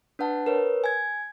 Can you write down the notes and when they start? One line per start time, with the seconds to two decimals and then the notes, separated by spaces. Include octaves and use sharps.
0.19 D4 B4 F#5 A5
0.46 A#4 B4 C#5
0.84 G#5 G#6